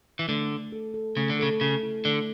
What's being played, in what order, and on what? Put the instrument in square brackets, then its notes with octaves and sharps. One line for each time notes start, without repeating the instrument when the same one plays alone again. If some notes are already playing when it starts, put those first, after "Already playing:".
[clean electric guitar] E3
[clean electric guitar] D3 [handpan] A3
[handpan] A3
A4
A4
[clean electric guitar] C#3 [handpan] A3
[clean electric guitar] D3
[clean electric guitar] C#3 [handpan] A4
[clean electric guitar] C#3 [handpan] A4
[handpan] E4
[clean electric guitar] D3 [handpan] A3